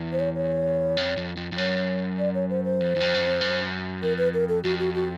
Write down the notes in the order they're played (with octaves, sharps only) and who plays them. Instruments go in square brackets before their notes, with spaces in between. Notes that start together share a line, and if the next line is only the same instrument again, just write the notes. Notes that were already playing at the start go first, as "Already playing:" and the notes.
Already playing: [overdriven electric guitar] E2
[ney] C5
C#5
C#5
[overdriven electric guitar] F2
F2
F2
F2
[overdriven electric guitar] F#2 [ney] C#5
[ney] D5
C#5
C5
C5
[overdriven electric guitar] F2
E2
F2
F#2
F2
F#2
[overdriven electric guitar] F2 [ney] A#4
[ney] B4
A#4
A4
[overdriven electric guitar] F2 [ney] F#4
[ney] F#4
F#4